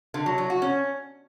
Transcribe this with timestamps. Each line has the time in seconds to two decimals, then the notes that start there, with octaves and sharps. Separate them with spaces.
0.14 D3
0.26 F#3
0.38 F#3
0.50 F#4
0.62 C#4